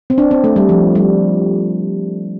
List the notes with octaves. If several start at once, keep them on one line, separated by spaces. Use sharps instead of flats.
C4
D4
C4
A3
G3
F3
G3